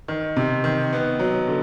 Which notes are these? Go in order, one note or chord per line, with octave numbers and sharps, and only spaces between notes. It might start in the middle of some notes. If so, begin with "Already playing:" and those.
D#3
C3
D#3
B3
F#3
D3